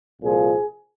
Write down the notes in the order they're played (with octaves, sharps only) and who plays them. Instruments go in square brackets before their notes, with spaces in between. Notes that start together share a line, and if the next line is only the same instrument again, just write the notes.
[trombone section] C2 A#2 F3 G#4